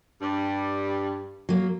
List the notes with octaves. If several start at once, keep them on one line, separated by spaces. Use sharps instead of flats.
G2 G3
F#3 A#3